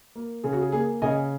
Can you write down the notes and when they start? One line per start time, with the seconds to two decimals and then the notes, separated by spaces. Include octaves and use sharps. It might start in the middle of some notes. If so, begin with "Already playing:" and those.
0.15 A#3
0.43 C#3 G#4
0.53 F#4
0.61 G#4
0.72 A#3 G#4
1.02 C#3 D#5 G#5